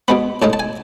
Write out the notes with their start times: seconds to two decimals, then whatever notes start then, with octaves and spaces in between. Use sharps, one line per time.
0.08 B2 G#3 B3 B5
0.42 A2 G#3 D#4 A5
0.53 A5
0.59 G#5